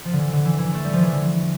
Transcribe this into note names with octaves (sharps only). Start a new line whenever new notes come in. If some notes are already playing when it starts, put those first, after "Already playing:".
F3
D3
E3
D3
E3
E3
A3
G3
F3
E3
D3